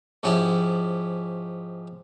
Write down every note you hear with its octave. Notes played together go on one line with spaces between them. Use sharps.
G#2 F3 C#4 E4 G4